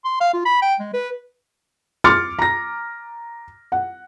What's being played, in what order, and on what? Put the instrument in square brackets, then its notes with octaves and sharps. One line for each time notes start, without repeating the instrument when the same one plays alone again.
[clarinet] C6
F5
F4
B5
G5
G#3
B4
[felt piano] C6 D6 F6 A6 C#7
A#5 A#6
F#5